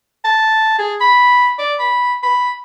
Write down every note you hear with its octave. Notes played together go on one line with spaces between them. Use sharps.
A5
G#4
B5
D5
B5
B5